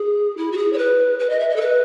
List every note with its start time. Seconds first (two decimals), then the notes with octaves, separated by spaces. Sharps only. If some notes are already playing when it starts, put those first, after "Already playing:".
Already playing: G#4
0.37 E4
0.52 F#4
0.57 G#4
0.73 C#5
0.78 B4
1.19 B4
1.29 D#5
1.39 E5
1.49 D#5
1.56 A4
1.61 B4